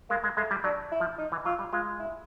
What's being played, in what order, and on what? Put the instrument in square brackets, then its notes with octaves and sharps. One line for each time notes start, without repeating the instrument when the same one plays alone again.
[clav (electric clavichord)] G#3 [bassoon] A#3
[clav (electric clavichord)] G#3
[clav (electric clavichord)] G#3 [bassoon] A3
[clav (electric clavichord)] G3
[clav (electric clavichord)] F#3 [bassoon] D4
[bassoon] E4
[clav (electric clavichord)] F3
[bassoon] D#4
[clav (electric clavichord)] E3
[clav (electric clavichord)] F#3 [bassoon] F4
[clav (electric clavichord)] G3
[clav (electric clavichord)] G#3 [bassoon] F4
[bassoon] E4